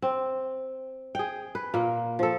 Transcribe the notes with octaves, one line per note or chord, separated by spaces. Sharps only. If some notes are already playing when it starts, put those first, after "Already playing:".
C4
G#4 G5
B4
A#2 A#3
F3 A4